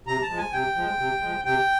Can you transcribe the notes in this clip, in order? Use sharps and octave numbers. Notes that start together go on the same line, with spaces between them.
C3 A#5
A5
F3 G#3
G#5
C3 G5
F3 G#3
C3
F3 G#3
C3 G5